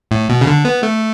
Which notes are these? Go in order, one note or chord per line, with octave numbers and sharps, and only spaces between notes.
A2
B2
C#3
D3
B3
A3